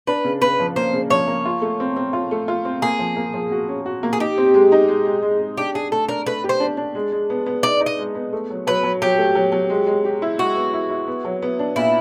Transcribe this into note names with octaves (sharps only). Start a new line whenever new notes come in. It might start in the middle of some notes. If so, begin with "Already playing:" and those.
D4 B4
C#3
C#3 B4
F3
A#3 C5
C#3
F3 C#5
A#3
F4
A3
C4
C4
F4
A3
F4
C4
A#3 G#4
F3
A#3
F3
F#4
C#4
F#4
A#3
G#4
D#4 G4
C4
G#3
D#4
G#3
G#3
G#3
G#3
D4 G4
D4 G#4
A3 A4
D4 A#4
A3 B4
G4
C5
D4
D4
G#3
G#3
B3
B3
D#4 D5
D#4
D#5
G#3
B3
A3
F#3
F#3 B4
F#3
F#3 G4
A3
F#3
F#3
G#3
G#3
G4
E4
G#3 F#4
B3
E4
E4
B3
F#3
B3
D4
A#2 E4